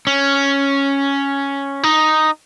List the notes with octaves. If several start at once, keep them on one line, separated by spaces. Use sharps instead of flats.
C#4
D#4